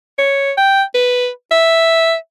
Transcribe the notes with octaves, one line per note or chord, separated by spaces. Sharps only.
C#5
G5
B4
E5